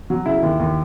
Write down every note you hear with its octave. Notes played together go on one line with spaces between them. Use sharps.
F#3
C#3 E4
D#2
D#2